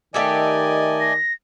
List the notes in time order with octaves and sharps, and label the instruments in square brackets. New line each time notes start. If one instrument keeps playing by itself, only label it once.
[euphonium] D#3 [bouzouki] A3 G4 A4 [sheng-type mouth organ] D5 D#5 G#5
[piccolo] A#6